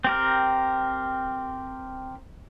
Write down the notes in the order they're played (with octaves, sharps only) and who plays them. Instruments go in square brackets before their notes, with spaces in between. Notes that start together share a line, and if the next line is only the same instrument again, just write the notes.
[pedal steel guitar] C4 G4 A#4